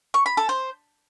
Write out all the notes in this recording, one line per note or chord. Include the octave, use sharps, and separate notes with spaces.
C#6
B5
A4
C5